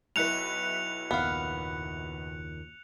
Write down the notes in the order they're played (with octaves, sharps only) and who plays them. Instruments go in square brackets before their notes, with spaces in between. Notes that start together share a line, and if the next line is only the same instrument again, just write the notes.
[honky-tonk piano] B1 E4 B4 [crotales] F#6 C#7 F7
[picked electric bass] F#1 D#2 A#2 [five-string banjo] B3 F5